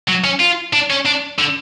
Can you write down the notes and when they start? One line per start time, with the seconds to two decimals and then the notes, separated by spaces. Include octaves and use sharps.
0.08 F#3
0.25 C#4
0.40 F4
0.73 D4
0.90 C#4
1.06 D4
1.39 D3